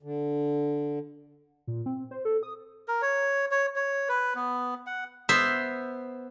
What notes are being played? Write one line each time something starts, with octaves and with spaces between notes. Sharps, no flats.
D3
A#2
C4
C5
A4
D#6
A#4
C#5
C#5
C#5
B4
B3
F#5
B3 C5 E5